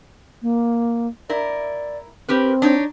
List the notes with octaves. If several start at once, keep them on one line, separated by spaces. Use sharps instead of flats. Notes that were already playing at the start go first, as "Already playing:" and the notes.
A#3
E4 A#4 D5
C4 G4 A#4 B4
D4 D#4 C#5